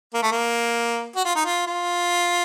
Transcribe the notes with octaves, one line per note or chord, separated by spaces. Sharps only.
A#3
A3
A#3
F#4
F4
D#4
F4
F4